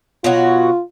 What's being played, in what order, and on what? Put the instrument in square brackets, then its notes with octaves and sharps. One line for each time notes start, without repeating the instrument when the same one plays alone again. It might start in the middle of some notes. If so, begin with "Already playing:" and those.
[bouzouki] B2 F#3 F#4 [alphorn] F4